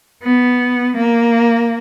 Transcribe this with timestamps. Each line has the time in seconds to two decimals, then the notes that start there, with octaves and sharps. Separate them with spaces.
0.23 B3
0.97 A#3